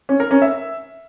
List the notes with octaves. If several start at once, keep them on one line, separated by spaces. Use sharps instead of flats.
C#4
A#4
C#4
E5